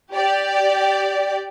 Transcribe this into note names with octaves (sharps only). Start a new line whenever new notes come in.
G4 D5